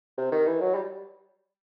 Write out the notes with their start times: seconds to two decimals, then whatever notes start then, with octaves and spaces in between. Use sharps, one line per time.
0.18 C3
0.32 D#3
0.47 E3
0.61 F#3
0.75 G3